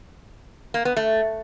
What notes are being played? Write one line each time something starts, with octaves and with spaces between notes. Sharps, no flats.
A#3
B3
A3